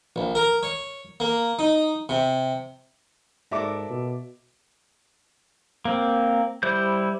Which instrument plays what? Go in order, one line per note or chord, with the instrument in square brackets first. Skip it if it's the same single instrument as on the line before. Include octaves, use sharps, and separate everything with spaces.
[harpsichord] A#1
A#4
C#5
A#3
D#4
C3
[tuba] G#2 [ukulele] F#4 A4 A#4 [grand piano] D5 E5 D6
[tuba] B2
[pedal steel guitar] A#3 C4
G3 E4 C5 G6